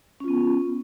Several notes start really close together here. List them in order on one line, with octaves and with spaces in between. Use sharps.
C#4 F4 B3